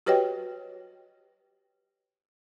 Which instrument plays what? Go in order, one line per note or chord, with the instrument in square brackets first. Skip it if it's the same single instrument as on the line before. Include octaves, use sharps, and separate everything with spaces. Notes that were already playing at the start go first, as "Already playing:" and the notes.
[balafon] F#4 G4 B4 C#5 D#5 G5